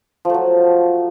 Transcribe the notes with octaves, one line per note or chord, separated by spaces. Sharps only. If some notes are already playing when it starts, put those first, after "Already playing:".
F3 F#3 A3